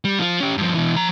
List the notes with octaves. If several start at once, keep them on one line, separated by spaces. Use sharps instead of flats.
G3
F3 F4
C#4 G4
G2 F3
B2 E3
F3 A#5